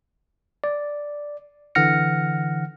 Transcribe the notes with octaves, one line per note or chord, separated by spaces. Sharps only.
D5
D3 E3 F#5 F6 A#6 C#7